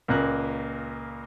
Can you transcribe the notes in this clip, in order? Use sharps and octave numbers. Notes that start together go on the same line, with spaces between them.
C#2 A#2 A#3 F#6